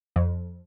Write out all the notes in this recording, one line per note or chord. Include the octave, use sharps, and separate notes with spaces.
F2